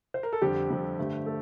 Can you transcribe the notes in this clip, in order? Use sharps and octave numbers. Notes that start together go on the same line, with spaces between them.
C5
A#4
A4
F2 D3 G3 G4
F2 D3 G3
G2 D3 A3
A3 A4